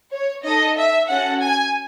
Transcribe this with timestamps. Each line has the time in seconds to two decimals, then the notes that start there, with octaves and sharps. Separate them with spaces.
0.12 C#5
0.44 D#4 A4 D#5
0.77 E5
1.09 C#4 F#4 A4 F#5
1.41 G#5